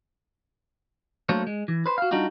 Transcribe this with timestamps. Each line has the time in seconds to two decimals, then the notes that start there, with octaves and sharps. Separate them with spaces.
1.29 F#3 A3 A#3 D4 C5 C#5
1.47 G#3
1.68 E3
1.86 B4 C5
1.98 F#4 F5
2.11 G3 D4 D#4 F4 F#4